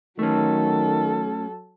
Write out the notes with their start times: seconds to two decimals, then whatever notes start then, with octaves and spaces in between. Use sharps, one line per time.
0.19 D#3 F#3 A3 C#4 A4